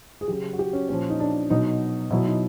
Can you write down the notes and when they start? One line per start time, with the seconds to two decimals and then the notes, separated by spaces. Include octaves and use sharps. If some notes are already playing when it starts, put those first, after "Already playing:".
0.21 G#4
0.28 C#3 F#3 G4
0.53 F#4
0.59 G4
0.73 C#4
0.89 A#2 F3 C#4
1.10 D#4
1.20 D4
1.50 B2 F#3 D#4
2.11 B2 F#3 E4
2.26 D#4